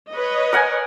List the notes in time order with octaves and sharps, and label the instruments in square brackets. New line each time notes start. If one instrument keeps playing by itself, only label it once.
[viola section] B4 C#5 D#5
[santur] A#4 F#5 G#5